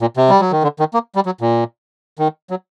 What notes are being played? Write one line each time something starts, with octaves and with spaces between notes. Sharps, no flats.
A#2
C3
G3
F#3
D#3
D3
D#3
A#3
G3
F#3
A#2
D#3
F#3